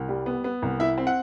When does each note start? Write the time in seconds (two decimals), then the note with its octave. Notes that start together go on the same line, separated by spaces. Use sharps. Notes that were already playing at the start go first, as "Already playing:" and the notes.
Already playing: C2
0.09 G3
0.26 B3
0.44 B3
0.62 C2
0.80 E4 E5
0.98 C4
1.07 F#5